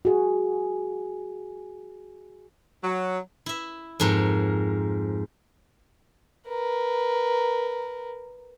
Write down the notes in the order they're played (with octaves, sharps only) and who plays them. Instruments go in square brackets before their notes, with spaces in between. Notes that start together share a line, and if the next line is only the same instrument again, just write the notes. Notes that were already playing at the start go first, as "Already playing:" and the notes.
[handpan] F#4 G#4
[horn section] F#3
[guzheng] E4 E5
F2 G#2 A#4
[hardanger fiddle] A#4 B4